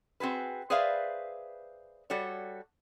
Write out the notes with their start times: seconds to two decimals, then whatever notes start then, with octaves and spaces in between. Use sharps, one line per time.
0.20 C4 F#4 G#4 B4
0.70 G#4 B4 C5 D5 E5 F5
2.10 G3 F#4 A4 C#5